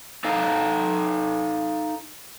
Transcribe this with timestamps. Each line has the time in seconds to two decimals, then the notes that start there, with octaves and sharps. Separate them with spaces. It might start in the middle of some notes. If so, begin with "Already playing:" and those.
0.24 D#4 A4 D#5 F5